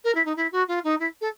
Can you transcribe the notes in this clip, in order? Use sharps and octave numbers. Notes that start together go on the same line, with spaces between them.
A#4
E4
D#4
E4
F#4
F4
D#4
E4
A4